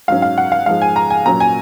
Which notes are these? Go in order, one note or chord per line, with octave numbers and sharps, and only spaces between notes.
G#2 F#3 C#4 F5
F5
F#5
F5
G#2 F3 G#3 F5
G#5
A#5
G#5
A#2 F#3 C#4 A#5
G#5